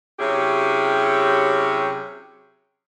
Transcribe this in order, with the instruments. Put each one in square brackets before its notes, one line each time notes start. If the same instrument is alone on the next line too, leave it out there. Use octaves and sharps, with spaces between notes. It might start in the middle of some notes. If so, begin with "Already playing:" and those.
[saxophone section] C3 F#3 C#4 E4 G4 G#4